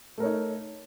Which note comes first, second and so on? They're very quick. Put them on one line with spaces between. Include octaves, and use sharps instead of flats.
A3 A#4 C#5 D#4